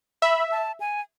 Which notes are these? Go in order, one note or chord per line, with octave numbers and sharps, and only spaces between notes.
E5 B5
A5
G#5